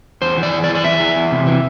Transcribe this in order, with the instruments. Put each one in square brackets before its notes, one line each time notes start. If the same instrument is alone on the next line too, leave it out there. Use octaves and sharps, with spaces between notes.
[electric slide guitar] E2 C5
E3
D5
E2
D5
E3
D5
E2 E5
E3
E2
C3
E3